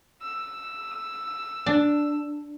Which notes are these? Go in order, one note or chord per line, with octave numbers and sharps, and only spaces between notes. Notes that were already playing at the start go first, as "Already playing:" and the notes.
E6
D4